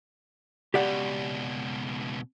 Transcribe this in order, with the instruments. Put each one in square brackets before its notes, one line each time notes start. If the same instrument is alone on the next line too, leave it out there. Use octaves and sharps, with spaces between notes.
[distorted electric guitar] C#2 B2 [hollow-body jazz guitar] G4 D5 F#5